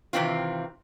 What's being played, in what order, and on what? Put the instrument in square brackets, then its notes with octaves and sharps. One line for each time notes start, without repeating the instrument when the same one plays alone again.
[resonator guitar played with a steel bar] C3 D#3 E3 C4 F4